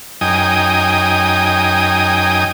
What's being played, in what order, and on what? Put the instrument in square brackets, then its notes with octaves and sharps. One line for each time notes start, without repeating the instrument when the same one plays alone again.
[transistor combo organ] F#2 D#4 G5 G#5 D#6